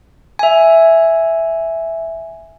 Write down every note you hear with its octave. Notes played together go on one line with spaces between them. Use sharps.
E5 G#5